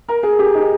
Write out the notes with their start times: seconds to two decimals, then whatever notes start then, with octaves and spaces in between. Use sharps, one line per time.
0.08 A#4
0.23 G#4
0.39 G4
0.54 D#4